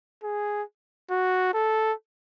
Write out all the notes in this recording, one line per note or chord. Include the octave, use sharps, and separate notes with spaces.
G#4
F#4
A4